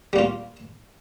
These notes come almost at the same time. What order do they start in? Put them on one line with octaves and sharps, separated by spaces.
G3 A#3 F4